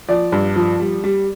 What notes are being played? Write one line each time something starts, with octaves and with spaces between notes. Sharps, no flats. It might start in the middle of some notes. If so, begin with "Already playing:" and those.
F3 D5
G2
F3
G3
G3